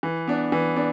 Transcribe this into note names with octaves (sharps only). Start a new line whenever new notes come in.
E3
B3 D4
E3
B3 D4